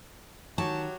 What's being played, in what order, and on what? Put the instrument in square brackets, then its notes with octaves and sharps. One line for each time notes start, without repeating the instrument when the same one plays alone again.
[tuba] D#3 [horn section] F#3 F#4 G4 [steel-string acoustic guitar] A5